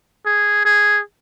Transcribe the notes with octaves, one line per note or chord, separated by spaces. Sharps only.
G#4
G#4